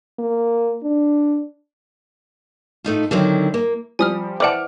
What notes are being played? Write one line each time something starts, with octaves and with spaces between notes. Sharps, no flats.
A#3
D4
A2 A3 D#4 F4
D3 D#3 F#3 C4 E4
A#3
F3 G3 C4 G#5 D#6 F6
E3 C5 D5 F#5 A5 D6 F6 D7